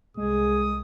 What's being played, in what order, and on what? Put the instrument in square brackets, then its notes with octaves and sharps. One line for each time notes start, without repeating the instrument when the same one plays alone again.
[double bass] C2 [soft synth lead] G#3 [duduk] G#4 [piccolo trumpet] D#6